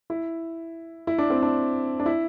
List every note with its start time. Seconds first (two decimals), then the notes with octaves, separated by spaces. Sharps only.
0.10 E4
1.07 E4
1.18 D4
1.30 C4
1.42 D4
2.00 D4
2.06 E4